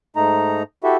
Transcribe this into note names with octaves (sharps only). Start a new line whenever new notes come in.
G#2 A3 D#4 A#5
E4 F#4 G4 A4 E5